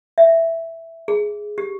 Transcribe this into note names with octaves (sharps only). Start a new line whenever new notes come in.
E5
G#4
G4